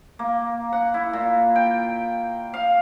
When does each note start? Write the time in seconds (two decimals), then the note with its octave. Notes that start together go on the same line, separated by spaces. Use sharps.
0.19 A#3
0.73 F#5
0.94 E4
1.13 A#2
1.56 G5
2.54 F5